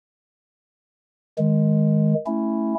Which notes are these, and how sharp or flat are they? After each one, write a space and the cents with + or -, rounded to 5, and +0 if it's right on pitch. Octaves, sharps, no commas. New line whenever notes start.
D#3 +10 G#3 +5
A3 +0 C#4 +0 E4 +0